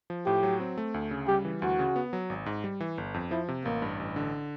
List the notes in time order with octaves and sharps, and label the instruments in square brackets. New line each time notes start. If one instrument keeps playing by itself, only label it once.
[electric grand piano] F3
[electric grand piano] A2 [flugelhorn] G4
[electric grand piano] F#3
C4
A3
D2
C#3
[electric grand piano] G3 [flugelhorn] G4
[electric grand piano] E3
[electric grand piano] D2 [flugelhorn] F#4
[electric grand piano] C#3
B3
F#3
G#1
G#2
G3
E3
G1
F2
[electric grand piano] F3 [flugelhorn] E4
[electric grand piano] C3
[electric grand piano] A1 [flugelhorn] A#3
[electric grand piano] G2
A1
D3